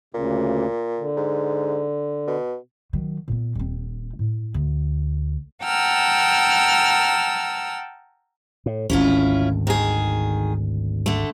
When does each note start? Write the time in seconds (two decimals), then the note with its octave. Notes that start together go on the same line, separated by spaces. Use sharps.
0.14 D2 A#2 C#3
0.99 D3
1.17 G#2
2.27 B2
2.93 D#3 F#3
3.28 A#2 B3
3.55 D#1 C4
4.19 A2
4.54 D2
5.65 F#5 G5 A5 A#5 E6 F6
8.66 A2
8.90 G#1 D2 C#4 E4 F4
9.67 D#3 G#4
11.06 D3 A3